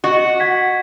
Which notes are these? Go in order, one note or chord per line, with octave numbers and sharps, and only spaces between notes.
F#4 D#5 C#6
F#5 G#6 B6